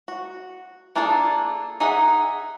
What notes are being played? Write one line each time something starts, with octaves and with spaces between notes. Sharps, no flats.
F#4
A#3 D4 F4 G#4 A4
D#4 G#4 D#5 E5 F#5